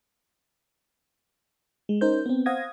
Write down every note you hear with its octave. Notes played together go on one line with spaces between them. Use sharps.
G#3
C#4 D#4 A#4 C5 G6
B3 C4
C5 F5 F#5 D#6 G#6 A#6